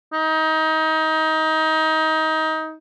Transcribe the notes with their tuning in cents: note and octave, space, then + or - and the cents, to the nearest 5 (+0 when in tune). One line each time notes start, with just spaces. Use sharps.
D#4 +25